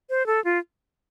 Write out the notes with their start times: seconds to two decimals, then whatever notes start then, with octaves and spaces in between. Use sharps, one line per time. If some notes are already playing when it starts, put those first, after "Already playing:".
0.10 C5
0.27 A4
0.44 F4